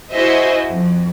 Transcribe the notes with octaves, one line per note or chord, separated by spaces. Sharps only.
E4 F#4 G#4 C5 D#5 E5
F2